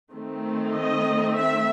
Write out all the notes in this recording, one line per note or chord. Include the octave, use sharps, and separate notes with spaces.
D#3 A3 C4
D#5
E5